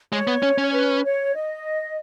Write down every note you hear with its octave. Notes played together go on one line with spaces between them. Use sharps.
G#3 C#5
B3
C#4
C#4
B4
C#5
D#5